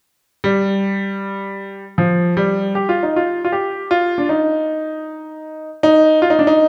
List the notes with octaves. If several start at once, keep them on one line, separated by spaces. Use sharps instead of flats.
G3
F3
G3
G4
F4
D#4
F4
F4
G4
F4
D4
D#4
D#4
F4
D#4
D4
D#4